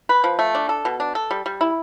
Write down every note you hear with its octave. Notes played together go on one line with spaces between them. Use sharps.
B4
F3
A3
D4
A4
B2
D4
A4
G3
G3
E4